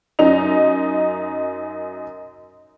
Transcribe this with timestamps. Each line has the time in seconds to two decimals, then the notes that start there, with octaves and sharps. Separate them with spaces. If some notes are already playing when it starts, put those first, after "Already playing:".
0.19 F#2 D#4 D#5 F7